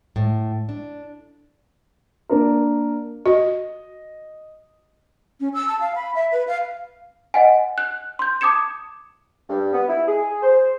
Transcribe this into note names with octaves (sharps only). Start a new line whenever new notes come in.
A2
D4
A#3 D4 A#4
F#4 D#5
C#4
E6
A5
F5
B5
E5
B4
F5
D#5 F#5 G#5
F#6
C6 G6
A5 D6 D#6 G#6 C#7 E7
G2
B3
E4
G#4
C5